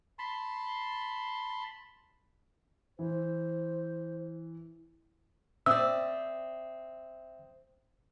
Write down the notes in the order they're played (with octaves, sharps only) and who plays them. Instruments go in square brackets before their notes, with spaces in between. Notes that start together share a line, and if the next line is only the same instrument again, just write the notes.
[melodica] A5 B5 C6
[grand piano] E3 [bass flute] C5
[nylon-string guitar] C4 D5 [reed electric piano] E5 D#6 [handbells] E6